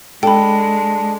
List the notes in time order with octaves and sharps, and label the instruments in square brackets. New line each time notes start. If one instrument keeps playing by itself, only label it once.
[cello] G#3 [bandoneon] D4 [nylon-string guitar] A4 [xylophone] G5 B5